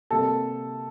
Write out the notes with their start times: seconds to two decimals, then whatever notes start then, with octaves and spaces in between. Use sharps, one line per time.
0.10 C3 G3 A#3 A4